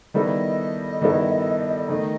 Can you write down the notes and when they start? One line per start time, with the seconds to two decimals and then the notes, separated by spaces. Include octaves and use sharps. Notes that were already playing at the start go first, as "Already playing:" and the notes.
0.14 D#3 G3 B3 E4 A4 D#5
1.01 D#3 G3 B3 E4 A4
1.88 D#3 A3 D#4 D#5